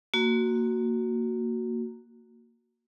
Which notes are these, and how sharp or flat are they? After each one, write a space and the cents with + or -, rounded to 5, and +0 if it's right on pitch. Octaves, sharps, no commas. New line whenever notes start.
A#3 -10 F#4 +0